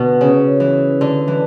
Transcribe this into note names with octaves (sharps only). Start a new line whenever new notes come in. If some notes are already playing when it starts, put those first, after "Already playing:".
Already playing: B2 D3
C#3
E3
D3
E3